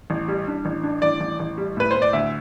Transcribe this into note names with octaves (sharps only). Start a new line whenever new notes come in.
A1
G3
D4
A1
D4
A1 D5
A1
A1
G3
A2 B4
A2 C5
D5
D2 E5